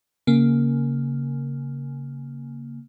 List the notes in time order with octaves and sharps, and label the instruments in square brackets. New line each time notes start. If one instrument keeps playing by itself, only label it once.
[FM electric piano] C#3 A#3